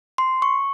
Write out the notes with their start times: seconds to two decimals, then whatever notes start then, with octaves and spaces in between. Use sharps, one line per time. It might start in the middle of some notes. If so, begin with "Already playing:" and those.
0.18 C6
0.42 C#6